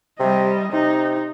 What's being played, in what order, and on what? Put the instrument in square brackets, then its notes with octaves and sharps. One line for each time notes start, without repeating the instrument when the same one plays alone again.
[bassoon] C3 [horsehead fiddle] G3 D#5
[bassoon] C3 [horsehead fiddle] D#4